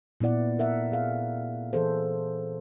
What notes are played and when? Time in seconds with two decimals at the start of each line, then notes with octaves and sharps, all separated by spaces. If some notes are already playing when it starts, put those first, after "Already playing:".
0.21 A#2 B3 E4 D5 F#5
0.59 A#4 E5 F#5
0.91 C4 G#4 F5
1.73 E3 G#4 A4 C5